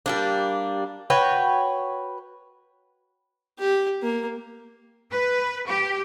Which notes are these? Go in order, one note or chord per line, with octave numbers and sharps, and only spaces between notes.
G3 A#3 D4
F#4 B4 C#5 G5
G4
A#3
B4
G4